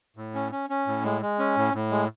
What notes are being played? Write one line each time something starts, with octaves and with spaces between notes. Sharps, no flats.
A2
C#4
C#4
C#4
A2
G#3
G#3
C#4
A2
A2
G#3